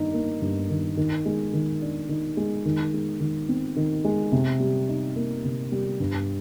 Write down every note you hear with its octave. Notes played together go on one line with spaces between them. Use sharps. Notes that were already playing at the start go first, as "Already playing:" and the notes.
Already playing: G2 D#3 D#4
A#3
G2
D#3
D#3
G#3
D#3
D4
D#3
G#3
D#3
G#3
D#3
C4
D#3
G#3
C3
G3
D#4
A#3
C3
G3
G2